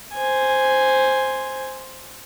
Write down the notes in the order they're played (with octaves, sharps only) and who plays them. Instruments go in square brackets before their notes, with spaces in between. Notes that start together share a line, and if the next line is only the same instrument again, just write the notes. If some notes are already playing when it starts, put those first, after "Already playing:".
[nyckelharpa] C5 G#5